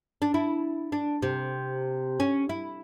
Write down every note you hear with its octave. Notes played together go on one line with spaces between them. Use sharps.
D4
E4
D4
C3
C#4
E4